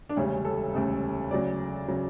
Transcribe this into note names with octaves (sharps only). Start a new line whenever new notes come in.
D4
E1 D2 C#3 G3 C#4
A4
E1 D2 C#3 G3
D2 C#3 F#3 D5
C#3 F#3